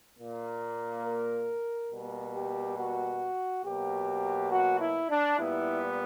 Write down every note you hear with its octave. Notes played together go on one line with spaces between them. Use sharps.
A#2 A#3
A#4
B2 G3 A#3
G4
F#4
B2 F#3 A#3 G4
F#4
E4
D4
A#2 G3 B3 E4